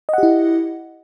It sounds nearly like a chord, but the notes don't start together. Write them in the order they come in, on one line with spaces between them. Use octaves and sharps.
D#5 F#5 G4 E4